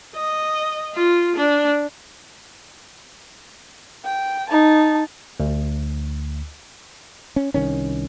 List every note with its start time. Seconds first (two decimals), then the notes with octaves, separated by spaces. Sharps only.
0.15 D#5
0.95 F4
1.36 D4
4.05 G5
4.50 D#4 A5
5.40 D2
7.36 C#4
7.54 C2 D#3 C#4